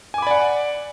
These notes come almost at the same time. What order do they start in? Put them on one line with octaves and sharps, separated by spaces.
G#5 D6 B5 D5 F#5